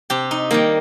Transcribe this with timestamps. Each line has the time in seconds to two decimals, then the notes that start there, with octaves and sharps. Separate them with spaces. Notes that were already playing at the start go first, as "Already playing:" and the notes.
0.10 C3 G4
0.31 D#4
0.51 D#3 G3 A#3